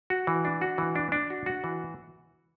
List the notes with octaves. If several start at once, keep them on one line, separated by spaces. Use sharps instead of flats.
F#4
E3
D4
F#4
E3
D4
D4
F#4
F#4
E3